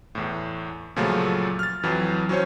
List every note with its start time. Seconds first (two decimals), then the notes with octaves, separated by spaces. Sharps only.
0.15 E2 A2
0.96 A#2 C#3 F3 F#3 A3
1.59 F6 A6
1.83 F2 E3 F#3
2.29 F#3 C#4 C5 C#5